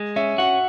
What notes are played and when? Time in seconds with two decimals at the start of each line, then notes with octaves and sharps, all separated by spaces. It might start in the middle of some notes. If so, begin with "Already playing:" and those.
Already playing: G#3
0.16 C#4 E5
0.38 F#4 F#5